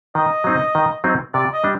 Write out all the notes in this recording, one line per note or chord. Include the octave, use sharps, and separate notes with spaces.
D#3 D#5
F#3 C4 D#4
D#3
F#3 C4 D#4
C3 D5
D#5
G3 D4